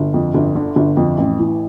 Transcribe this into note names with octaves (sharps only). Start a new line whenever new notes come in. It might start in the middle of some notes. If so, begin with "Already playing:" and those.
Already playing: G1
F2
G1
D3
G1
F2
A1
E3